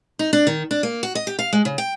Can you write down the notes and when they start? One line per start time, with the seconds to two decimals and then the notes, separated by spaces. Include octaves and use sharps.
0.19 D#4
0.33 D4
0.47 D#3
0.71 D4
0.83 A#3
1.03 F#4
1.15 D#5
1.27 G4
1.39 F5
1.53 G#3
1.65 C#3
1.78 G5